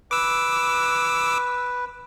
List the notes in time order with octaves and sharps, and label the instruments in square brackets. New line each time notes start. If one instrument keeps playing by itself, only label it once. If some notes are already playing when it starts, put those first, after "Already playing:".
[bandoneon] B4 [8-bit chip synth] D6 E6